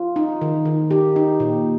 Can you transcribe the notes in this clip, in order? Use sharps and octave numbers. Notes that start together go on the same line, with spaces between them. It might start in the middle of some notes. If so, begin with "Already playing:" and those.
Already playing: F4
D#4
D#3
D#3
D#4 G4
D#4
A#2